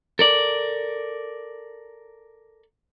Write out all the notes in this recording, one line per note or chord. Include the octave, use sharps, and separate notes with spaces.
A4 A#4 D5